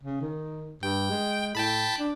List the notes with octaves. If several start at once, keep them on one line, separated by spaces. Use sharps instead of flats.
C#3
D#3
G2 G5
G#3
A2 G5 A5 B5
D4